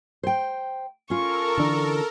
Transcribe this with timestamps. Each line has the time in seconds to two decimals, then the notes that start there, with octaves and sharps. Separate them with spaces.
0.23 C5 G5
1.10 C#4 F4 A4 A#4 C#6
1.57 D3 E3 D4